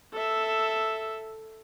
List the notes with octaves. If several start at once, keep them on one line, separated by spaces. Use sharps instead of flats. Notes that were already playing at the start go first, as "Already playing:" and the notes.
A4 E5